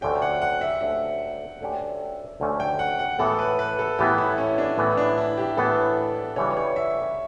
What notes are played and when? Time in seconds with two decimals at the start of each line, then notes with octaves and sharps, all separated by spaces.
0.01 D2 D3 A3 C#4 G4 G5
0.22 F#5
0.42 F#5
0.61 E5
0.81 D2 D3 A3 C#4 G4 E5
1.61 D2 D3 A3 C#4 G4
2.40 D2 D3 A3 C#4 G4
2.60 G5
2.79 F#5
2.99 F#5
3.19 A2 E3 B3 A4
3.39 B4
3.59 B4
3.79 A4
3.99 A2 E3 B3 G4
4.18 E4
4.38 C#4
4.58 D4
4.78 A2 E3 B3 E4
4.97 D4
5.18 E4
5.37 G4
5.57 A2 E3 B3 A4
6.36 C#3 E3 G3 D4 F#4 C#5
6.57 C#5
6.76 E5